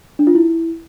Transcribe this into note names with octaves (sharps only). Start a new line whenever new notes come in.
D4
F4
E4